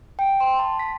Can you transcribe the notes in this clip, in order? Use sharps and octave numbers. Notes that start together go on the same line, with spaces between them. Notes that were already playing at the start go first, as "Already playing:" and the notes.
G5
C6
A5
B6